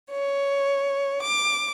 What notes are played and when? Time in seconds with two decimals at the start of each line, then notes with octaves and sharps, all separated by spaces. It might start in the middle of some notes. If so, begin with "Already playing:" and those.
0.11 C#5
1.22 D6